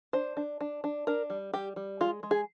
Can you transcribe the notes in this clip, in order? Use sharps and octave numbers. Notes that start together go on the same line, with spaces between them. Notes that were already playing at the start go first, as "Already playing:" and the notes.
D4 C5
D4
D4
D4
D4 A#4
G3
G3 G4
G3
G#3 F4
G#3
G#4